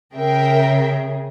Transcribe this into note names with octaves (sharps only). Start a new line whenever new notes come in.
C#3 G#4 A#4 E5 G5